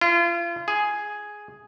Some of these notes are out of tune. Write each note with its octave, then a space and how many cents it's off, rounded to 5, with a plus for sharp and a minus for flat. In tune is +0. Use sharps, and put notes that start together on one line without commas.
F4 -35
G#4 +5